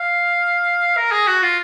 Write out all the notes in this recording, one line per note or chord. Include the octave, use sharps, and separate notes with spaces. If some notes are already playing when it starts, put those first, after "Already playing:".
Already playing: F5
A#4
G#4
F#4
F4